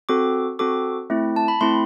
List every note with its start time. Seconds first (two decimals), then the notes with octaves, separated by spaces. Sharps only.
0.09 C4 F#4 A4 D6
0.59 C4 F#4 A4 D6
1.10 A3 C4 E4
1.36 A5
1.48 B5
1.61 A3 C4 E4 C6